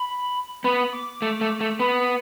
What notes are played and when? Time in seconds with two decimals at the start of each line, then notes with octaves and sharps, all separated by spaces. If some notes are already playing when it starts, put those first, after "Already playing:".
Already playing: B5
0.64 B3 B5
0.92 D6
1.22 A3
1.41 A3
1.61 A3
1.80 B3 B5